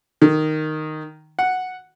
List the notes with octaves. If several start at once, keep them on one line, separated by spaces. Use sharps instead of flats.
D#3
F#5